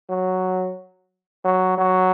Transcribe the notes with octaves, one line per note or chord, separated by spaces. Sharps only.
F#3
F#3
F#3